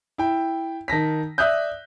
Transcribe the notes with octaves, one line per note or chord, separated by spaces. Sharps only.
E4 G5
D#3 A5 A#6 B6
D5 E5 D#6 F#6 G6